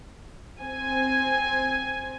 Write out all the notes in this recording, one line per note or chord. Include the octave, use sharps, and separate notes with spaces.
C4 G#5